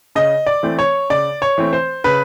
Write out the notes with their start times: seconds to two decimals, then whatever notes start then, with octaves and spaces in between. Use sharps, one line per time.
0.15 C#3 D#5
0.46 D5
0.63 E3 A3 C4
0.79 C#5
1.10 C#3 D5
1.42 C#5
1.58 E3 A3 C4
1.73 C5
2.04 C#3 B4